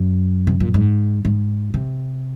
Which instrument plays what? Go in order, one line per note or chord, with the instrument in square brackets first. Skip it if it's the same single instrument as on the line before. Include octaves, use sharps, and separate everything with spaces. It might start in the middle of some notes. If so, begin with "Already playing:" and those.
Already playing: [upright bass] F#2
C3
A#2
G#2
G#2
C3